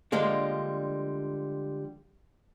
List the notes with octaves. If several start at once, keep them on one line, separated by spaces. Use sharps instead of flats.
D3 F3 G3 G#3 A#3 D4